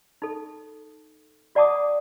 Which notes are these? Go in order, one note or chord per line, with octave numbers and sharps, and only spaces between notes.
D#4 A4
F#4 D5 F#5 A5 D6 D#6